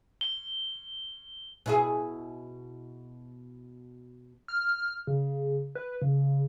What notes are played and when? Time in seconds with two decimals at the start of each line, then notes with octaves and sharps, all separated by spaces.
0.21 G7
1.66 B2 E4 G#4
4.48 F6
5.07 C#3
5.75 B4
6.02 C#3